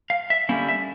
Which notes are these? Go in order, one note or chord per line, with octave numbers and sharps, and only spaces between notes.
F5
E5
D3 G3 A#3 C#4 E4
E5